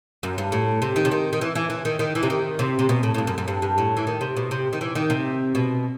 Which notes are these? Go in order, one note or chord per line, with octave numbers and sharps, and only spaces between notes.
F#2
G2
A2
C3
D#3
C3
D#3
D#3
E3
E3
E3
D#3
D#3
E3
C3
D#3
C3
C3
B2
A2
A2
G2
F#2
F#2
G2
G2
A2
E3
D#3
C3
B2
C3
D#3
E3
D#3
C3
B2